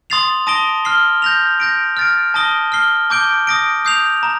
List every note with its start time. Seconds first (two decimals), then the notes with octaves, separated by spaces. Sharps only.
0.10 C6 D#6 A6 C7 F7
0.47 A5 D#6 A#6 D7 G7
0.85 F6 C7 G7
1.22 G6 A#6 F7
1.60 G6 A#6 D7
1.97 F6 A6 D7
2.34 A5 D#6 A#6 D7 G7
2.72 F6 C7 G7
3.10 A5 D6 G6 D7 G7
3.47 D#6 A#6 D7
3.85 D#6 G6 C7 F7
4.23 A#5